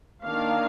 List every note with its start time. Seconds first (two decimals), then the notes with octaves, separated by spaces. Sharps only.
0.25 D#3 A#3 D4 F5